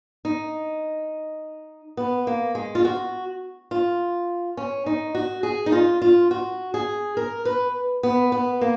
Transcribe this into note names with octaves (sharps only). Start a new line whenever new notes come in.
D#4
B3
A#3
G#3
F4
F#4
F4
C#4
D#4
F#4
G#4
D#4
F4
F4
F#4
G#4
A#4
B4
B3
B3
A#3